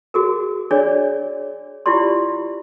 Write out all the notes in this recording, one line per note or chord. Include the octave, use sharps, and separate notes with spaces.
F#4 G#4 A#4
D4 G#4 C#5 D5
E4 F4 G4 D5 C6